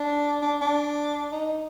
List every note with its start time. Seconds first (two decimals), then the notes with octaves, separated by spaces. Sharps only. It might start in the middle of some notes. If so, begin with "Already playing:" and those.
Already playing: D4
0.42 D4
0.62 D4
1.32 D#4